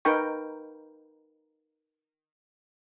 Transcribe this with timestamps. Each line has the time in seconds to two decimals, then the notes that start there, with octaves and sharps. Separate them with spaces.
0.05 D#4 A#4 B4 G5 C#6